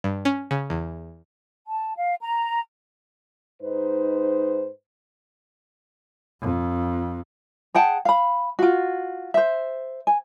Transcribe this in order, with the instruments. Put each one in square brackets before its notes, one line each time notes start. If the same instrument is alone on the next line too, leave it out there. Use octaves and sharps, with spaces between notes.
[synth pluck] G2
C#4
C#3
E2
[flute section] A5
F5
A#5
[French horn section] G#2 D#4 B4 C5
[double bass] F2
[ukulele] G#4 F#5 G5 A5
F5 B5
F4 F#4
C5 E5
G#5